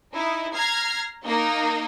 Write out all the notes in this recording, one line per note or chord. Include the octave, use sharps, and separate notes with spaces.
D#4 E4
A#5 F6 G#6 C7
A#3 D#4 A#4